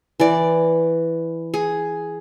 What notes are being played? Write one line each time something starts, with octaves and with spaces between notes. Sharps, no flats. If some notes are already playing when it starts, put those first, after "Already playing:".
E3 D5
G#4